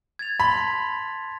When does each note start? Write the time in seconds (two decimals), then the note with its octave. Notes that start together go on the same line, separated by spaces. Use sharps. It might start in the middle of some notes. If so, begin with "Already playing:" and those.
0.19 G#6 A6 F7
0.40 A5 B5 C6 B6